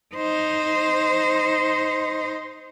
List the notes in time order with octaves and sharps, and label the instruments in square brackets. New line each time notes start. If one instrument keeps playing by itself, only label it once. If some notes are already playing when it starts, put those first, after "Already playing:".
[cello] D#4 C5